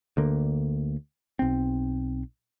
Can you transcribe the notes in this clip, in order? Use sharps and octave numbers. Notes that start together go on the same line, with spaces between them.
D2 D3 A#3
B1 C4